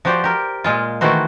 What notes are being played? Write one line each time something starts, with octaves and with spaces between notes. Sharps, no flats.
F3 F#4 G4 C5 D5
G4 A#4
A#2 G#3 F4
D#3 E3 A3 F#4 C5